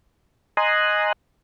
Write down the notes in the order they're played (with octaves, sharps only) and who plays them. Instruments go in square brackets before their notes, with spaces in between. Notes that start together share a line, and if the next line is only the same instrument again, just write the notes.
[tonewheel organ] D#5 G#5 A#5 C6 D#6 F#6